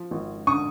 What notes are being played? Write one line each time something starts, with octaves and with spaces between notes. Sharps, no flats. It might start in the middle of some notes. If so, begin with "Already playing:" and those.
Already playing: F3
G#1
D3 C#6 D#6